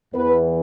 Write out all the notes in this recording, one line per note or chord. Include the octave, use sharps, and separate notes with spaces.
E2 E3 B3 B4